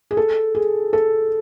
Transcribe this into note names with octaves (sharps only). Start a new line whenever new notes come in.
G#4
A4
G#4
A4